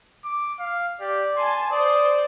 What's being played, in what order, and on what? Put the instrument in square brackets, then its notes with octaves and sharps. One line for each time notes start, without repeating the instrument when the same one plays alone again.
[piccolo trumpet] D6
F5
[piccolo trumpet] G4 [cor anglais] D5
[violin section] G#5 A5 [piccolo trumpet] C6
[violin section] C5 [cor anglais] D5 [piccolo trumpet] D#6